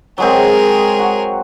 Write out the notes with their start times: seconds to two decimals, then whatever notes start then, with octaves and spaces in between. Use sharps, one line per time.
0.18 F#3 G#3 C4 G#4 A#4
0.99 F#4